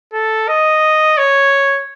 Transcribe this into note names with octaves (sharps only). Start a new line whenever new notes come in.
A4
D#5
C#5